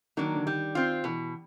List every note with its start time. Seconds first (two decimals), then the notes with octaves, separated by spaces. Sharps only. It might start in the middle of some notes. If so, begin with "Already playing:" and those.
0.17 D#3 F#3 A#3 D4
0.35 D3
0.46 D#3 G3
0.75 C4 F4
1.04 B2 E3